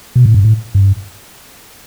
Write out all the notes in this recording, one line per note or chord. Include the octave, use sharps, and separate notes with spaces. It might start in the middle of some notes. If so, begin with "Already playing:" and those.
B2
A2
G2
A2
G2